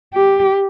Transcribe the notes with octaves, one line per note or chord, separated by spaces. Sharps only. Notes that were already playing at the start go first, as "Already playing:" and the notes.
G4